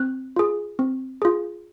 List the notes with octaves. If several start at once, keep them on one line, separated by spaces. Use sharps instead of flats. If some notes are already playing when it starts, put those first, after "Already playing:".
Already playing: C4 F#6
F4 G#4
C4
F4 G#4